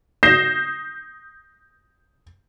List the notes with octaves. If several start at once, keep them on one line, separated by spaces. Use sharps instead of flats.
D#6 G6 A#6 C7 E7